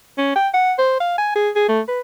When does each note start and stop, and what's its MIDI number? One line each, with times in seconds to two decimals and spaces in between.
0.18 0.35 61
0.36 0.48 79
0.54 0.73 78
0.78 0.95 72
1.00 1.14 77
1.18 1.31 80
1.35 1.50 68
1.56 1.66 68
1.68 1.81 57
1.88 2.00 71